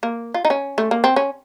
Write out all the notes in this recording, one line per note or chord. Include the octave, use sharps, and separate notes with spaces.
A#3
F4
D#4
C#4
A3
A#3
C4
C#4